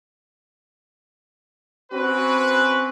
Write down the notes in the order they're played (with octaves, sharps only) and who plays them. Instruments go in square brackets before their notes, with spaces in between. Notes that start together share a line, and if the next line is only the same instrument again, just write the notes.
[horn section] C4 C#4 F#4 B4